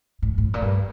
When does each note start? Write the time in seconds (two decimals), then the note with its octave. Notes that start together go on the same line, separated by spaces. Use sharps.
0.22 A2
0.38 A2
0.54 A#2
0.62 G2